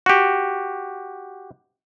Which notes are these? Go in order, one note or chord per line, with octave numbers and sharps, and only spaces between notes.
F#4 G4